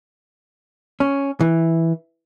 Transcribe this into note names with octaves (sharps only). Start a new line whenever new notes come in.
C#4
E3